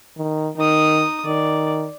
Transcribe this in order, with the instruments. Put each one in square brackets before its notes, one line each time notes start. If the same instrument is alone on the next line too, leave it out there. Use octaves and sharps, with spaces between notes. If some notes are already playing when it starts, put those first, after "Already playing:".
[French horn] D#3
[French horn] D#3 [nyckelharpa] D#4 D#6
[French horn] D#3 [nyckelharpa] D5